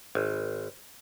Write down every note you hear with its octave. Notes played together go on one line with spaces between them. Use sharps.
G#1